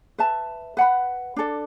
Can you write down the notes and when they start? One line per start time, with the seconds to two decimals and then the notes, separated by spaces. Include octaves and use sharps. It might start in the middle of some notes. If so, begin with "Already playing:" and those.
0.18 B4 E5 A5
0.77 B4 F#5 B5
1.36 D4 A4 D5